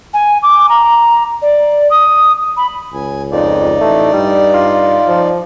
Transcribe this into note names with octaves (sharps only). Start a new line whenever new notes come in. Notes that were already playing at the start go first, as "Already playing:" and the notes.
G#5
D6
A#5
D5
D#6
B5
C#2 G#5
F2 D#4 D5
A1 A3
G2 G3
F4
F3